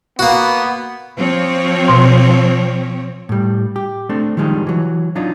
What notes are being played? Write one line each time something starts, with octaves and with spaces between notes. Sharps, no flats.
A#3 B3 F#4
F3 C4 C#5
B2 C6
A2 G3
G4
A3 C4 D4
D#3 F3 G3 G#3 D#4
E3 F#3
F#3 D4 D#4 F4